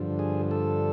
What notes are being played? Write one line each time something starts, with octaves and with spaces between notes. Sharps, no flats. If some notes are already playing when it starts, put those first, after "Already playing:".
Already playing: G2 D3 F3
G#4
A4